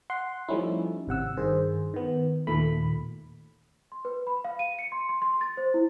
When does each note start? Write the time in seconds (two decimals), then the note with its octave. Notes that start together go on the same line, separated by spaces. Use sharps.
0.10 F#5 C6
0.48 F3 G3 A3 C#4 D#4 E4
1.07 G#1 C3 F#5 E6
1.37 G2 D#3 G#4 C5
1.94 D#3 B3
2.47 D#2 A#2 D#3 A3 B5
3.92 C6
4.05 B4
4.27 B5
4.44 F5
4.59 D#7
4.79 C#7
4.92 C6
5.09 C6
5.22 C6
5.41 A6
5.57 C5
5.74 E4